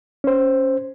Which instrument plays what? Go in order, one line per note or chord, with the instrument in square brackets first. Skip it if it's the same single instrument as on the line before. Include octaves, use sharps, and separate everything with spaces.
[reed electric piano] C#4 C5